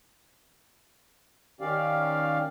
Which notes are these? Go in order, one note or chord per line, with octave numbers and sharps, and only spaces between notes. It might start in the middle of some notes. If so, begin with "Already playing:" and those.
D#3 C#4 G4 D5 F5